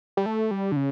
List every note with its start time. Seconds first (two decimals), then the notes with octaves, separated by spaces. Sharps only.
0.17 G3
0.26 A3
0.51 G3
0.72 D3
0.76 C#3